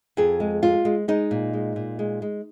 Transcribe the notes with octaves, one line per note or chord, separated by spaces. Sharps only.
F2 G#4
G#3
G#3 F4
G#3
G#3 D#4
A#2
G#3
A#2
G#3
G#3